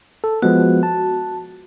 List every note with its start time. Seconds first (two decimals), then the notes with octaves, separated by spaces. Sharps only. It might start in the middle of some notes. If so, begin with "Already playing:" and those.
0.24 A4
0.42 F3 G#3 B3 F#4
0.83 A5